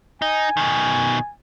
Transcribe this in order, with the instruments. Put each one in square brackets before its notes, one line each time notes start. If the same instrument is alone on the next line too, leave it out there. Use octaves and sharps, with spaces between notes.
[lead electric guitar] D#4 [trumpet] G#5
[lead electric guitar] B2 D#3